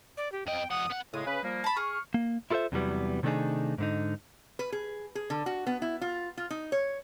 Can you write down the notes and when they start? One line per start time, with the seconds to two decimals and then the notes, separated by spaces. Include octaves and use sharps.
0.17 D5
0.32 G4
0.47 F2 D#5 G5
0.71 F2 F#5 D#6
0.90 B3 F#5
1.13 A2 C#3 G#3 D#6
1.27 C#3 C#4 B4
1.43 F3 G3 A#3
1.64 A5 B5
1.77 G#4 C#6 F6
2.14 A#3
2.51 E4 F4 A4 A#4 C5 E5
2.72 E2 C3 E3 F#3 G3 B3
3.23 C3 D#3 A3 D4 D#4 G#4
3.78 G#2 D3 D#4
4.59 B4
4.72 G#4
5.15 G#4
5.30 D3
5.46 F#4
5.67 B3
5.82 E4
6.01 F4
6.37 F4
6.50 D#4
6.72 C#5